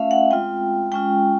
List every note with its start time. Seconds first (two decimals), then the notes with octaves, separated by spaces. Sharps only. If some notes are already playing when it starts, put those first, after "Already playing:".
Already playing: A3 C#4 F4 E5 F5
0.11 F#5
0.31 G#3 C4 F4 G5
0.92 G#3 C#4 F4 G5